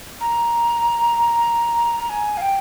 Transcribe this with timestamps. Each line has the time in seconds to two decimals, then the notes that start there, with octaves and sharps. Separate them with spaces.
0.21 A#5
1.99 A#5
2.09 G#5
2.37 F5
2.42 G5